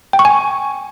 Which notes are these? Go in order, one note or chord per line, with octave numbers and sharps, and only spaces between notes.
G5
C#6
G#5